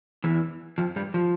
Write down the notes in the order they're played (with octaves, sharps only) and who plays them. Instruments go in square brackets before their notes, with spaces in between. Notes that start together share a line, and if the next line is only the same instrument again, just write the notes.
[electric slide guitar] E2 E3
F2 F3
G2 G3
F3